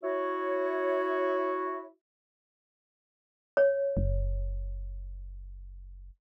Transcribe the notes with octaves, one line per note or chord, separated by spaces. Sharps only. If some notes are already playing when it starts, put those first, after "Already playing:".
E4 F#4 C#5
C#5
F#1